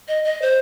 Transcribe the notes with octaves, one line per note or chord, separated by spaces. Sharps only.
D#5
D#5
C5